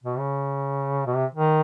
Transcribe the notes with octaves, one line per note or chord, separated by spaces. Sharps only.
B2
C#3
B2
C3
D#3